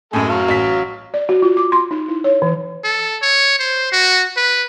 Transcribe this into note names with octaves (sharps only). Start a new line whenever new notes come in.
F#2 A2 G#3 A4 G#5
F#3 F5
A1 B6
D5
F#4
F4
D6
C6
D#4
E4
C#5
E3
A4
C#5
C5
F#4
B4